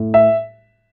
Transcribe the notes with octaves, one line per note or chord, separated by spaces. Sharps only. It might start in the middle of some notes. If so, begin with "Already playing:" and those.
Already playing: A2
E5